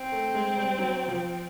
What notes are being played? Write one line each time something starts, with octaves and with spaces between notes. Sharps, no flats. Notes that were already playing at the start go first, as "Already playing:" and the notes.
Already playing: C4
A3
G#3
G3
F#3
F3